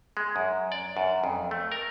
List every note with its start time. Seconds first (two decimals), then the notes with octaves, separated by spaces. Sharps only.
0.17 G#3
0.36 F#2
0.72 D5
0.97 F#2
1.24 F2
1.51 A3
1.72 A#4